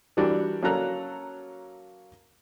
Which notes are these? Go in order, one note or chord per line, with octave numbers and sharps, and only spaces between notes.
E3 G3 D4 F#4 G4 A#4
F#3 A#3 C#4 A4 A#5 F#6